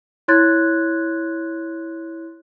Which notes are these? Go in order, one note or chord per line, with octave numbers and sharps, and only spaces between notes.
E4 C#5 C6 F#6 G#6 A6